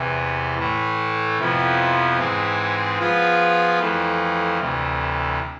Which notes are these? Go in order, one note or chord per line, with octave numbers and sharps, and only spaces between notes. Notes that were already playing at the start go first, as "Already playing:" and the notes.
Already playing: E2 C3 E3
A2 E3 A3
F2 C3 F3 B3 E4
G#2 E3 G#3 C4
F3 B3 F4 G#4 B4
F2 E3 A3
D2 C3 E3